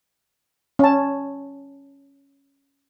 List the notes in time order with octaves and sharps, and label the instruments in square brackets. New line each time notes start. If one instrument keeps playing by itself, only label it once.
[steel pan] C#4 A5